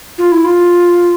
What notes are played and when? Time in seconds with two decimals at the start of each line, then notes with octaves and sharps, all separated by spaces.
0.18 F4
0.32 E4
0.44 F4